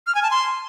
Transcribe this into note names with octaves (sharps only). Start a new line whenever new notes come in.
F6
G#5
A5
C6